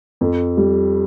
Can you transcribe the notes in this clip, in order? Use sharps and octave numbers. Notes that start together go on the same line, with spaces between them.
F2
G3